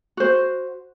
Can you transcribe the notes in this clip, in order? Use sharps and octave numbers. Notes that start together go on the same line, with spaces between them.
F#4 C5